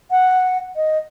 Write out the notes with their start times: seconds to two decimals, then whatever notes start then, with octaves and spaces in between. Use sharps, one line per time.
0.11 F#5
0.76 D#5